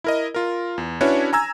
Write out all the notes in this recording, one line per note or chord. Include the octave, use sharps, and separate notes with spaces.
E4 A#4 D#5
F4 A#4
E2
C#4 D4 E4 F#4 B4 C#5
G#5 A#5 E6 G#6